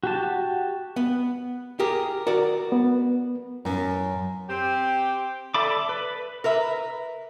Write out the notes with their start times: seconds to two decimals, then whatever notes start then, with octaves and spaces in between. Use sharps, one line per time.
0.03 F#4 G4 A5
0.96 B3
1.80 G4 G#4 A#4
2.27 F#4 A#4 D5
2.72 B3
3.65 F#2
4.50 C4 G4
5.54 A4 D5 E5 B5 D6
5.89 B4
6.44 A#4 B4 E5